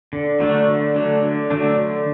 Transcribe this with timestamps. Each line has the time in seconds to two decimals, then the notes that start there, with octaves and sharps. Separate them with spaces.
0.13 D3
0.40 F#3 A3 D4
0.68 D3
0.96 F#3 A3 D4
1.22 D3
1.50 F#3 A3 D4
1.78 D3